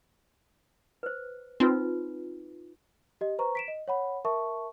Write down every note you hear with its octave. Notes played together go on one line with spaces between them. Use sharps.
B4 C5
C4 D#4 F4 B4
G4 D#5
B4 C5 A#5 C#6
B6 D7 E7
D#5
C#5 F#5 B5
A#4 E5 A5 C#6